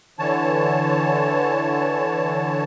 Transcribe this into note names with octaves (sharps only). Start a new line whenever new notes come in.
D3 E3 C#5 A5